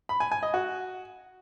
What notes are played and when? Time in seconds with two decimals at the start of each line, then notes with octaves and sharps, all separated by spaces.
0.09 B5
0.20 G#5
0.32 G#5
0.43 D#5
0.54 F#4